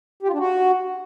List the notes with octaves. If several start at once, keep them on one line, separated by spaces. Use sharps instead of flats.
G4
F4
D4
F#4